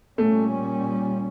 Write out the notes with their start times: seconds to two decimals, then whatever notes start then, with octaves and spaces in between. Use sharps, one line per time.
0.18 A#2 G3 A3 C#4